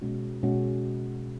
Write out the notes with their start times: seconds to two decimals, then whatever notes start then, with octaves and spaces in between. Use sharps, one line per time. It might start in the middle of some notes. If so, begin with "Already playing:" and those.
0.01 B2 G#3 C#4 F#4
0.43 B2 G#3 C#4 F#4